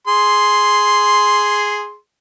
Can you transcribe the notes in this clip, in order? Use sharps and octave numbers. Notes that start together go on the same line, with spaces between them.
G#4 C6